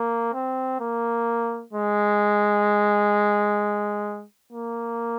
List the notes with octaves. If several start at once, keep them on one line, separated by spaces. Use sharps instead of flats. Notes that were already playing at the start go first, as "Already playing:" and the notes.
Already playing: A#3
C4
A#3
G#3
A#3